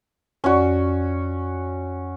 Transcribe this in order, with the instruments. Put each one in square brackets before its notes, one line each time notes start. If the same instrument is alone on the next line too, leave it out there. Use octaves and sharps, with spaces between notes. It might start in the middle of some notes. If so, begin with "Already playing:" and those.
[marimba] F2 D5 [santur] C#4 F#4